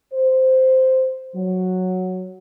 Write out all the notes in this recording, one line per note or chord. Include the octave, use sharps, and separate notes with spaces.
C5
F#3